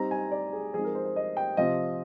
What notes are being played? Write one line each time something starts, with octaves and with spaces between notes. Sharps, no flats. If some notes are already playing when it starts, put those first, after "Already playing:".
Already playing: G3 C4 D#4 A#5
G#5
D5
G#4
F3 G#3 C4 D#4 G#4
A#4
C5
C5
D#5
G5
C3 F3 C4 F4 D#5